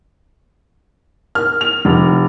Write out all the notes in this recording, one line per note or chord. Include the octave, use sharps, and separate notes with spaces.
F6
F7
F1